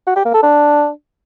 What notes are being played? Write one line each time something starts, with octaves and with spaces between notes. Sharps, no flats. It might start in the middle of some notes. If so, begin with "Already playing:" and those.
F#4
G4
A#3
A4
D4